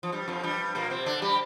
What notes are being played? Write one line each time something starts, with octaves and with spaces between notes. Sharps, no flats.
F3
G2 G3
F2 F3
G2 G3
A#2 A#3
C3 C4
D3 D4
G3 G4